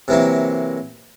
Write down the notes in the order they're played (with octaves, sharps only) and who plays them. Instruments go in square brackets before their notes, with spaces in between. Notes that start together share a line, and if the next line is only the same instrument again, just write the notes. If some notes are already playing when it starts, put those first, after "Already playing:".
[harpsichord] C3 E3 F#3 A#3